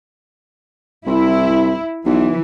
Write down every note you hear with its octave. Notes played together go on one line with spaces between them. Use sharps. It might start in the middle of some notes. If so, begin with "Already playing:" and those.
C2 E4
B1 E3